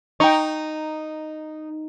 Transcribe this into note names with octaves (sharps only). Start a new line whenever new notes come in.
D#4 G5 A#5 C#6